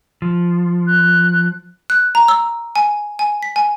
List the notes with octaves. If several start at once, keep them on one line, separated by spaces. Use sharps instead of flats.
F3
F#6
F#6
A#5
E6
G#5
G#5
B6
G#5